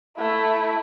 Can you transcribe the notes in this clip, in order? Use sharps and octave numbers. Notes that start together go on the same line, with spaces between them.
A3 E4